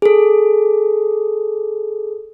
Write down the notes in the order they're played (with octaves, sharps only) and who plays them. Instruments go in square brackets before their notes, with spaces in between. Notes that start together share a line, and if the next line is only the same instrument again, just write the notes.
[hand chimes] G#4 A4